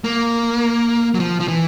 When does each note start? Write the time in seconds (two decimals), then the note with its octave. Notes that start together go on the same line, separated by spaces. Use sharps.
0.04 A#3
1.15 F#3
1.20 F3
1.40 F3
1.48 E3